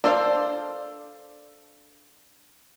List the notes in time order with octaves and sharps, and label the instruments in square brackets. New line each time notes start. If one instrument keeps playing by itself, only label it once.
[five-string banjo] D4 A4 C5 D5 F5